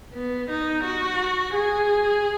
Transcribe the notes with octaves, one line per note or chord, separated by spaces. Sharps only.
B3
D#4
F#4
G#4